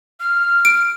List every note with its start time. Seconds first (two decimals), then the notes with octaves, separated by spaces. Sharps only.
0.20 F6
0.65 D7